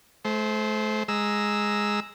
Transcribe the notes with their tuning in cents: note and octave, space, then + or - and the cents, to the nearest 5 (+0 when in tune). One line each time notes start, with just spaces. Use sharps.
A3 -35 C5 +0
G#3 +0 A#5 +0 E6 -5